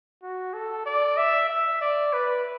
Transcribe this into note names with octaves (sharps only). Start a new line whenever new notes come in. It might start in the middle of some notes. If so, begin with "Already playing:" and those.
F#4
A4
D5
E5
E5
D5
B4